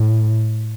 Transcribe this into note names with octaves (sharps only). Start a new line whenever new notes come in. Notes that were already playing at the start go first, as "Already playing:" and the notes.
Already playing: A2